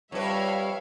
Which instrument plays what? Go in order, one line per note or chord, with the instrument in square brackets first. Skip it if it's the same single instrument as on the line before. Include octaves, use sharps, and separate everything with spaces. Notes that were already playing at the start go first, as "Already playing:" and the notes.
[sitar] F2 B4 [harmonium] G3 [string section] C#5 E5 F5